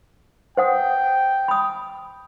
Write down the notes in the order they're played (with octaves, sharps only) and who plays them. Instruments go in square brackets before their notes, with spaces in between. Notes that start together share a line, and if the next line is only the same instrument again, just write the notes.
[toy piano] C5 F#5 D#6 [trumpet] G5
[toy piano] B5 D#6